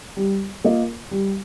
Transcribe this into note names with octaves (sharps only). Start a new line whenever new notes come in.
G3
A#3 F4 A#4 D#5
G3